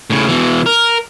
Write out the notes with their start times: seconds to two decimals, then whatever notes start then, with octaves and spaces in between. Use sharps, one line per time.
0.10 A2 C#3
0.28 B2 E3
0.66 A#4